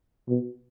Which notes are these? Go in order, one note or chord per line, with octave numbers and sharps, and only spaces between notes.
B2